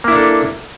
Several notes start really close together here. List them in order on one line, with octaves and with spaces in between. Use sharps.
A#3 E4 D4 A4